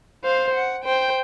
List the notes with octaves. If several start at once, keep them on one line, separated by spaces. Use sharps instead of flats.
C5 F5
F#5
C5 G5